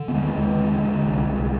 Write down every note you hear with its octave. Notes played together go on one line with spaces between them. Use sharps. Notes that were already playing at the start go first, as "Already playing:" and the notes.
Already playing: D3
B3
D#2 G#3
D#2
D3
D3
C2
C2